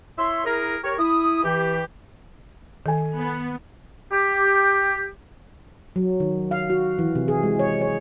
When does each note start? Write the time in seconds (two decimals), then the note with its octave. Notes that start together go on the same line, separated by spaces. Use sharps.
0.18 E4 C#5 E5 C6
0.45 E4 G#4 A#4
0.84 G4 A#4 C#5
0.98 E4 D#6
1.44 E3 G4
2.86 D#3 A4 G#5
3.17 B3
4.12 G4
5.96 F#3
6.20 D#3
6.51 F5
6.70 F#4
6.99 E3
7.15 C3
7.28 G#4
7.43 G#3
7.59 C#5
7.81 C#5